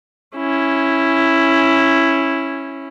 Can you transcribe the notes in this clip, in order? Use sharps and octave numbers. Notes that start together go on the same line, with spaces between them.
C#4 E4